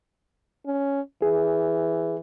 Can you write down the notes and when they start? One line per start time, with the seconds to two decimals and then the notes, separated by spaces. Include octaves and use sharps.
0.66 C#4
1.22 E3 G#4